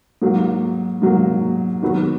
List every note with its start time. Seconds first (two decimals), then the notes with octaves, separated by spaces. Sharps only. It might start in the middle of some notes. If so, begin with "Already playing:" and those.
0.22 G#2 F#3 A#3
1.02 G#2 F#3 A#3
1.82 D#3 F#3 B3 F#4